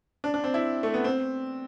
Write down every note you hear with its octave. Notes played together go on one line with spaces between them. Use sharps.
D4
D4
C4
E4
A3
B3
C4